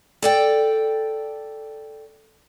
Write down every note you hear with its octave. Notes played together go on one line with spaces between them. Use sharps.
A4 D5 G5